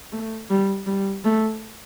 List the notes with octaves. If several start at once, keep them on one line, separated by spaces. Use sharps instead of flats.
A3
G3
G3
A3